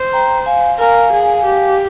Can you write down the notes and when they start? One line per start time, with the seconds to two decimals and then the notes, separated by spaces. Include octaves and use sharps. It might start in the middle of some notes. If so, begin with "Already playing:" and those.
Already playing: C5
0.13 G5 A#5
0.46 F5 G#5
0.79 A#4 F5 G#5
1.13 G#4
1.45 G4